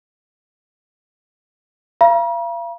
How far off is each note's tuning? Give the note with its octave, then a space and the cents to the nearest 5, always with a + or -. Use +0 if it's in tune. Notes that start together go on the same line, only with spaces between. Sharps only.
F5 -40 A#5 +45